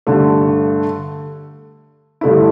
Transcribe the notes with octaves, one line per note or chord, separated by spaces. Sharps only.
G2 D3 A3
G2 D3 A3 E4